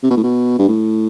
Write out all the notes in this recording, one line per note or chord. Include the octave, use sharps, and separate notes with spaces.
C3
B2
A2
B2
G2
A2